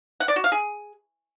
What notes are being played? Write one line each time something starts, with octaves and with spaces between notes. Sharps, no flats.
F#5
D5
F#4
F5
G#4